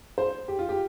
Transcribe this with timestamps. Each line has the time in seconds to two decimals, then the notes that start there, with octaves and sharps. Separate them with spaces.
0.18 C5
0.48 G4
0.59 F4
0.69 G4